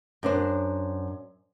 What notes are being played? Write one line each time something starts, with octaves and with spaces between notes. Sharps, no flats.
F#2 D4 C5